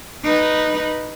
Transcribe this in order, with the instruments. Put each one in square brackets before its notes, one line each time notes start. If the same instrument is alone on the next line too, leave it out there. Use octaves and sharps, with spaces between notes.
[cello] D#4 B4